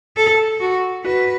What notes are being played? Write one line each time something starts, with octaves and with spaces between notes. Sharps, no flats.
A4
F#4
F#4 B4